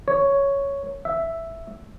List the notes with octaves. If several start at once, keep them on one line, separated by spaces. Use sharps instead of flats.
C#5
E5